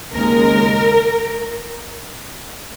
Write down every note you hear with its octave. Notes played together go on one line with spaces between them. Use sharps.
D#2 C#3 G#3 A#4